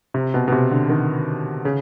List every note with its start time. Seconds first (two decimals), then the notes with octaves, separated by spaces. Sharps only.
0.14 C3
0.34 B2
0.48 B2
0.52 C3
0.71 D3
0.89 D#3
1.65 C#3